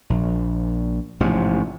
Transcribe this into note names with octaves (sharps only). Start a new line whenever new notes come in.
A#1
A1 G#2 C3 F3